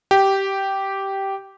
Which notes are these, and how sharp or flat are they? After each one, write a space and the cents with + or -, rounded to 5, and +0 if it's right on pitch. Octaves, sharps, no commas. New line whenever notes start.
G4 -10